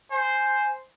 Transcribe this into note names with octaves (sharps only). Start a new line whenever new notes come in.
C5 G#5